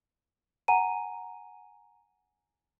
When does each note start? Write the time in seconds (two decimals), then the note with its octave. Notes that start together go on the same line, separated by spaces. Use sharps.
0.68 F#5 G#5 A#5 D#7